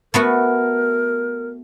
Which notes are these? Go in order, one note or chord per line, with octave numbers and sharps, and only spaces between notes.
A3 B3 F#4 A#4